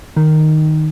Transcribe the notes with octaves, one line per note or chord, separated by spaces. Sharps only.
D#3